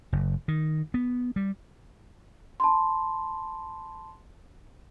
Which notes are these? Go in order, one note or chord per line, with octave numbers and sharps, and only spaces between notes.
F#1
D#3
B3
G3
A5 B5 C6